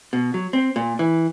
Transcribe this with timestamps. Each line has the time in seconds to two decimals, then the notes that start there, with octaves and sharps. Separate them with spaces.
0.13 B2
0.34 F#3
0.53 C4
0.76 A#2
0.99 E3